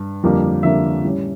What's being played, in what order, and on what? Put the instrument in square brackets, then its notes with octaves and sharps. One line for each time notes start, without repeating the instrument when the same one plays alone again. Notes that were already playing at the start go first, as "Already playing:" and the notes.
Already playing: [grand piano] G2
F2 D3 G3 A#3
F2 D3 G3 A#3 E5
A2 G3 C#4